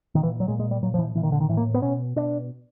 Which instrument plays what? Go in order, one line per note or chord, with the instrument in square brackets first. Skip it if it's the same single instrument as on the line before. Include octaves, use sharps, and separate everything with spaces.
[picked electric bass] A#2 D#3
E3
F#3
A#2 G#3
G#3
G3
A#2 F#3
F3
E3
A#2 E3
D#3
D3
D#3
A2 E3
A#3
B3
B2 C#4
B2 D4